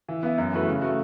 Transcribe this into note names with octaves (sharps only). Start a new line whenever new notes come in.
E3
B3 E4
F#2
E3 A3 F#4 B4
C#3
A3 F#4